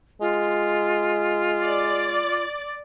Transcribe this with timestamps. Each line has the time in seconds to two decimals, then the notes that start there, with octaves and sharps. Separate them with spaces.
0.21 G#3 F4
1.61 D5